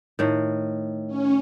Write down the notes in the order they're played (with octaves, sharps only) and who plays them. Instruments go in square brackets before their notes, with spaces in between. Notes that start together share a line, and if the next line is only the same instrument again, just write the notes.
[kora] A2 D#3
[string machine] C#4